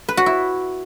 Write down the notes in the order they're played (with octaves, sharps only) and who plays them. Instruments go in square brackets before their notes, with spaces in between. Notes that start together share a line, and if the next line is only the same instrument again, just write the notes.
[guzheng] B4
F#4
E4